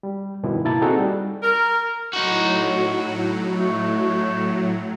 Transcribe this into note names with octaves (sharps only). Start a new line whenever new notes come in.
G3
G2 B2 D#3 F3 E4
C#3 A#3 E4 A#4 A5 A6
C4 D#4 F#4 G#4 A4
G3
A#4
A2 F#3 D#4 F#4
A3